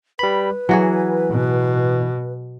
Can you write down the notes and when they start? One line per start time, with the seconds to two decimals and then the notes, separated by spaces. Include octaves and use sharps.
0.19 G3 B4 B5
0.69 E3 F#3 F#4 G#4
1.31 B2